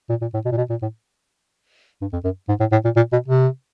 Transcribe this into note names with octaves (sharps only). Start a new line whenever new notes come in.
A#2
A#2
A2
B2
A#2
B2
A#2
A2
G2
F2
F#2
G#2
A2
A2
A#2
A#2
B2
C3